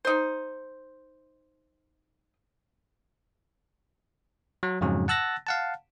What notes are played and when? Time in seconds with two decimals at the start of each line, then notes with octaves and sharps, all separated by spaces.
0.05 D#4 C5
4.63 F#3
4.81 F2 G#2 C#3 F#3
5.08 F#5 A5 E6 F#6 A6 A#6
5.47 F5 F#5 A5